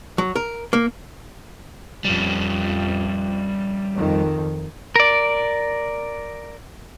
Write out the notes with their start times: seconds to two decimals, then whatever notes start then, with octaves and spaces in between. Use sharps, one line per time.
0.18 F#3
0.36 A#4
0.73 A#3
2.05 F2 G3 C#4
3.96 F2 D#3
4.96 A#4 D5